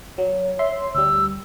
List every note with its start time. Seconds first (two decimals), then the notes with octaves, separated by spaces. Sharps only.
0.18 F#3 C#5
0.59 E5 C6
0.95 D2 G3 E6